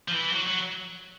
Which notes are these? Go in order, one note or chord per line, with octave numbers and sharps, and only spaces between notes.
F3
E3
F#3
F#3